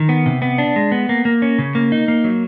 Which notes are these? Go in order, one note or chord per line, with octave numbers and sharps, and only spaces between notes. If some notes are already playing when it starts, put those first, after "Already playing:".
Already playing: D#3
B3
C3
B3
D4
G#3
B3
A#3
A#3
C#4
C#3
A#3
D#4
A#3
F#3